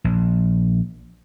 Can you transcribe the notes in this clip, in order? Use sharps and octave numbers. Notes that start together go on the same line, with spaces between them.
A#1